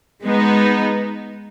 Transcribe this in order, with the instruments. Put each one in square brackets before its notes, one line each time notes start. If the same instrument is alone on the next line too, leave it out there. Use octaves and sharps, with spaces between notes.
[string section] G#3 B3 D#4